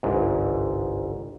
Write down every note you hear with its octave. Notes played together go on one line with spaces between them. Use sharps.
G1 C2 G#2